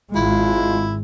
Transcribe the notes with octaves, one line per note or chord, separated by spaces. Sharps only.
G#1 G#3 E4 F4